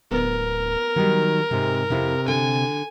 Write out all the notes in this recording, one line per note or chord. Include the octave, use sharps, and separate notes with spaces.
D1 B3 A#4
D#3 F#3 G3
G#2 C3
F2 C3 E4
D3 G#5